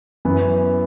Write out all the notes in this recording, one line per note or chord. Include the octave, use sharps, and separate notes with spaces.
F#2 E3 B3 B4